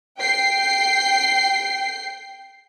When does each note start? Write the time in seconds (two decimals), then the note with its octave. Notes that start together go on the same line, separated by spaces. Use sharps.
0.19 G5 C7